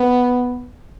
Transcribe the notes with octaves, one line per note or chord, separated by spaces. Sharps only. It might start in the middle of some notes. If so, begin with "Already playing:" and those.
Already playing: B3